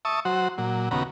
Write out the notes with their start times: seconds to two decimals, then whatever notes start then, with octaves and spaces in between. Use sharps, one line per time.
0.05 E5 A5 C#6 D#6
0.25 F#3 F#4 C5
0.58 A#2 F#3
0.91 D#2 C#3 B3 F#4 A#5